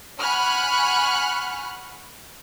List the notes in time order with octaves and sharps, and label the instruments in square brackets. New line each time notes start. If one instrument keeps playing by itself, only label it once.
[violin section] F#5 G#5 B5 C#6 F6 F#6